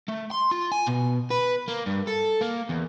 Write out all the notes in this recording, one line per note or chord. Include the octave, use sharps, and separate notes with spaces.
A3
C6
F4
G#5
B2
B4
A#3
G2
A4
A#3
E2